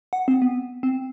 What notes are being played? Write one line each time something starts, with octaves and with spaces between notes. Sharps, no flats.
F#5
C4
B3
C4